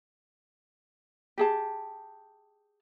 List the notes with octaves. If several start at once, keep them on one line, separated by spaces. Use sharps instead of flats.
G4 G#4 A5